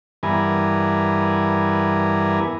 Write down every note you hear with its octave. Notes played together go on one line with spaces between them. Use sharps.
G2 E3 B3 A#4 G#5